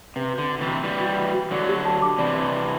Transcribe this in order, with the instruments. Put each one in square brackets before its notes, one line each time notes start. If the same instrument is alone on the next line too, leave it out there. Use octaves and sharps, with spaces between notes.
[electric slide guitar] C3 [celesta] B4
[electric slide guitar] D3 [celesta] F#4
[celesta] F#5
[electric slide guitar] C3 E3
[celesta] F#4
[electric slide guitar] E3 G3 [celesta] B4
[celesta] F#4
F#5
F#4
[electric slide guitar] D3 F#3 [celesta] D5
[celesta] G4
A5
D6
[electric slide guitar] C3 E3 [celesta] D5
[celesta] G4
A5